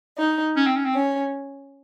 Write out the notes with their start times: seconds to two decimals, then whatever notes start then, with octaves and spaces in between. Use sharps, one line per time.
0.17 D#4
0.56 C#4
0.66 C4
0.76 C#4
0.85 C4
0.95 C#4